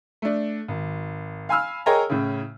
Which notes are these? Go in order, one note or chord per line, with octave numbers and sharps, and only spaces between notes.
A3 D4
G#1
F5 G#5 B5 E6 F6
G#4 A#4 C#5 D#5 G5 A#5
A2 C#3